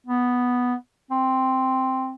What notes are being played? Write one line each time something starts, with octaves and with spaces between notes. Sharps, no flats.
B3
C4